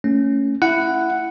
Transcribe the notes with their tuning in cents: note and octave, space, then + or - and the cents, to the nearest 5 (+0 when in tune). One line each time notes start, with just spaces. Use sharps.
A3 +30 C#4 +0
E4 +10 F#5 +0